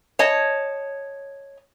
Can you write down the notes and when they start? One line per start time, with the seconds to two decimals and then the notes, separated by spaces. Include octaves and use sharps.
0.19 C#5 D#5 A5